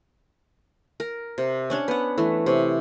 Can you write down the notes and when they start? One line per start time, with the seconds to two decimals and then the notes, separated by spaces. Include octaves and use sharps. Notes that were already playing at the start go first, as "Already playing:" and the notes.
1.00 A#4
1.38 C3
1.70 C#4 D4 C#5
1.88 B3 F#5
2.18 E3 A3
2.46 C3 C#5